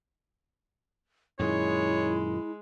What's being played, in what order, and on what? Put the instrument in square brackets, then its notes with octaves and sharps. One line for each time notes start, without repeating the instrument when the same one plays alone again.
[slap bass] F#2 A#2 D#3 [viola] G#3 [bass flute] E4 [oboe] C#5